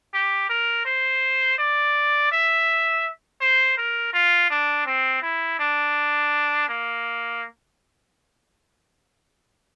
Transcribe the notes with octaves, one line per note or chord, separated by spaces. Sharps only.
G4
A#4
C5
D5
E5
C5
A#4
F4
D4
C4
E4
D4
A#3